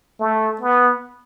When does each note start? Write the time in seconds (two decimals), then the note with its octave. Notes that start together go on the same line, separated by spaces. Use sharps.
0.20 A3
0.61 B3